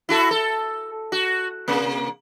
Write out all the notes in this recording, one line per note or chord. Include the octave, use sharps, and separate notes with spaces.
E4 F#4 A4
A4
F#4
C3 A#3